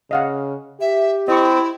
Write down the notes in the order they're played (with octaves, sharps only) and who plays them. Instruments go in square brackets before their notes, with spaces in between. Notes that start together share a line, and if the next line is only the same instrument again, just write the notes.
[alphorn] C#3 [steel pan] D#5 F5 F#5
[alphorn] G4 [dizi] E5
[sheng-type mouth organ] C4 [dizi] E4 [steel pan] D#5 C#6